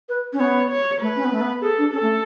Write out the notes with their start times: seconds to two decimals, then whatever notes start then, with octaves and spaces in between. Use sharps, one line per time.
0.09 B4
0.33 C#4
0.40 B3 C#5
0.70 C#5
1.01 A3 B4
1.16 C#4
1.25 B3
1.33 A3
1.41 B3
1.62 G#4 A4
1.78 D4
1.93 C#4 A4
2.02 A3